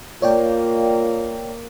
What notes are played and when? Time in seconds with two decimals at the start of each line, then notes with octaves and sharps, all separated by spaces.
0.22 A#3 F4 C#5 D5 G5